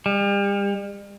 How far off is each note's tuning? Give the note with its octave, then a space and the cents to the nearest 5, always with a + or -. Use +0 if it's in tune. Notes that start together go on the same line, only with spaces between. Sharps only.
G3 +40